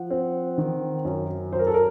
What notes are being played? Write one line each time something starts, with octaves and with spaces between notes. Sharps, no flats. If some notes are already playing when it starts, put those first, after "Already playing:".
Already playing: F3 F#5
C4
D#3
F#2
F#3 C5
A#4
A4
A#4